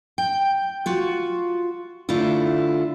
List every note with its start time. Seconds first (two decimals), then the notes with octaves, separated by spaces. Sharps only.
0.18 G5
0.86 F4 F#4
2.09 D3 A3 E4 F4